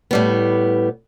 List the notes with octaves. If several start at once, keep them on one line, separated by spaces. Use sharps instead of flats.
A2 G3 B3